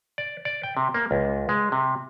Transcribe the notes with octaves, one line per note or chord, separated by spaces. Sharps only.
D5
D5
G5
C3
A#3
C#2
G#3
C3